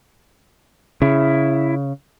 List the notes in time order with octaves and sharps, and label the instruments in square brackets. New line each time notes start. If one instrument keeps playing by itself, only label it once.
[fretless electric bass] C#3 [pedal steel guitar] E4